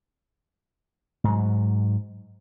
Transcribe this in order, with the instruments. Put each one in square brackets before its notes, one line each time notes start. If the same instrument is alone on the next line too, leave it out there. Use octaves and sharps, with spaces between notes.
[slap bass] G#2 F#3